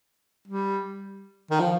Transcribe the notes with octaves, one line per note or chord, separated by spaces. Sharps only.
G3
D#3
F3